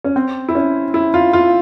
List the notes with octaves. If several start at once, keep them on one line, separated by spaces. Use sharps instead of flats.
C#4
C4
E4
C#4
E4
F4
F4